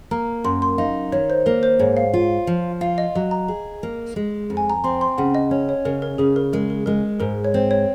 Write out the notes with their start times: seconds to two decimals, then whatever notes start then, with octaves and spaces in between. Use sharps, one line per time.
0.11 A#3 A#5
0.44 F#2 C6
0.62 C6
0.78 D#4 F5
1.12 D#3 C#5
1.30 C5
1.46 A#3 A#4
1.63 C5
1.79 G#2 C#5
1.97 F5
2.14 F4
2.47 F3
2.81 F4 F5
2.98 D#5
3.15 F#3 D#5
3.31 A#5
3.48 G#4
3.83 A#3
4.16 G#3
4.50 F2
4.57 G#5
4.70 A#5
4.84 C4 C6
5.01 C6
5.18 C#3 F#5
5.35 D#5
5.51 C#4 C#5
5.69 C#5
5.85 C#3 A#4
6.02 A#4
6.18 C#3 G#4
6.36 A#4
6.53 G#3 A#4
6.70 A#4
6.86 G#3 A#4
7.20 G#2 A#4
7.45 C#5
7.54 C4 C5
7.71 C#5